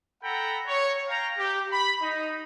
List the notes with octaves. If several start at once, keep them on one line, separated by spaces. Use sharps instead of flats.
A4 F#5 G5 A#5 B5
C#5
F5 G5 A#5
G4
B5
D#4